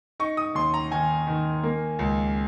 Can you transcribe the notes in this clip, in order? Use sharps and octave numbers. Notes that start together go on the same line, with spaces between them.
D#4 C#6
D#6
D#2 C6
A#5
D#3 G#5
D#3
A#3
C#2